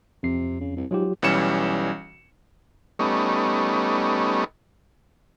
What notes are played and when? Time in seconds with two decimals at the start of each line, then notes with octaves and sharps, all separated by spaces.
0.23 F2 C3 C7
0.60 C#3
0.77 C2
0.91 G#2 F#3 F4 G4
1.22 B1 E3 G3 C#4 C#7 E7
2.99 G3 A3 B3 C#4 D#4